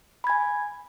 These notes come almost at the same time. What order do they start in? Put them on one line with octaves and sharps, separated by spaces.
B5 G#6 G#5